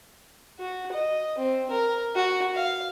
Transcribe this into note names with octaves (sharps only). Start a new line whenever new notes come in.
F#4
D#5
C4
A#4
F#4
F5